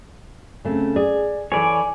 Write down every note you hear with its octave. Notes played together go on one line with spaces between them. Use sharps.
C#3 A3 C4
G#4 D5
E3 A4 B4 C#5 D5 G#5